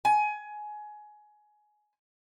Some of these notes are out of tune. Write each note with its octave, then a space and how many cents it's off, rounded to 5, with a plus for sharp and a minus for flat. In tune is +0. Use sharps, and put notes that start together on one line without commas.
G#5 +20